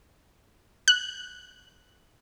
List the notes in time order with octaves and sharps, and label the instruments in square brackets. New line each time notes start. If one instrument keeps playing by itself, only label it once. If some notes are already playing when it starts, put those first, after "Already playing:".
[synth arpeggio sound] F#6